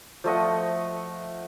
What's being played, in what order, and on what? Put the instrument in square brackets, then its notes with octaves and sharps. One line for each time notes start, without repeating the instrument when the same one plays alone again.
[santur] F3 A3 D#5 F#5